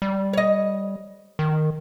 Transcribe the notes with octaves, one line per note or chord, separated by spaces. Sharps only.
G3
C#5 D#5
D#3